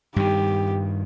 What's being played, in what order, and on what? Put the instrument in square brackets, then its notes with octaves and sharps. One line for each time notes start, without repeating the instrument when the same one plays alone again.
[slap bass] G2 D#3 [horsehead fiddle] G4